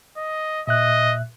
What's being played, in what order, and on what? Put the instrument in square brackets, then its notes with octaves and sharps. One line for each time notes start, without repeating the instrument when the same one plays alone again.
[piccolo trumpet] D#5
[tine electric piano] A#2 E5 F#6 [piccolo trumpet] D#5